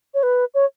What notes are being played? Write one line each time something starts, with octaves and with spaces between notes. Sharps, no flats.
C#5
B4
C#5